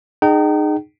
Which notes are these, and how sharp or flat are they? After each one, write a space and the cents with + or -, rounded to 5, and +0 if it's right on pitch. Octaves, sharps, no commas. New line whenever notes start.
D#4 -30 G#4 +0 G5 -35